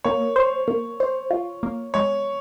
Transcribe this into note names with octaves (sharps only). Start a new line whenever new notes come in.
A#3 C#5
C5
A#3
C5
F4
A#3
G#3 C#5